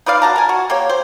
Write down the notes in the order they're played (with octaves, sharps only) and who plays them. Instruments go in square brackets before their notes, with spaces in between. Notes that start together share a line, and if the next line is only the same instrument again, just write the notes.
[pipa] D#4 B4 D5 F5
F#4 A5 A#5
A#4 G#5
F#4
A#3 G4 C#5
C5